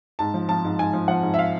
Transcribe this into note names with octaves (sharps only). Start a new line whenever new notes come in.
G#2 A5
F3
F3 A5
G#2
G#2 G#5
F3
F3 F#5
G#2
E5
F5